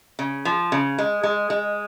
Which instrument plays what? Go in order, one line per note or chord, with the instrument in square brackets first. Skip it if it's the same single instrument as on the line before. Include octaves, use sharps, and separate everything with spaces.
[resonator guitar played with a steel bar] C#3
F3
C#3
G#3
G#3
G#3